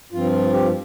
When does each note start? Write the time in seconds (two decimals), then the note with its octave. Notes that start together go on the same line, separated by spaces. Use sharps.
0.12 G2 F3 C4 F4
0.32 F4
0.53 G4